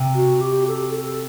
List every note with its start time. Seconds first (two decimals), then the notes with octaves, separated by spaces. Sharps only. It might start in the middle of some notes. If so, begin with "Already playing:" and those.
Already playing: C3
0.15 F#4
0.41 G4
0.68 A4
0.95 A4